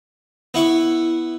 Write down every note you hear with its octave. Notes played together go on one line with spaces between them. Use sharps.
B3 E4 C#6